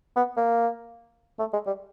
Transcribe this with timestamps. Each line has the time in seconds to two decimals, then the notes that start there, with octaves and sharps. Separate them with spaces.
0.16 B3
0.37 A#3
1.39 A3
1.53 G#3
1.67 G3